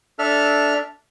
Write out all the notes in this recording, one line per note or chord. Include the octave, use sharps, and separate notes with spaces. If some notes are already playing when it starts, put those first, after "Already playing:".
D4 A4 E5 F6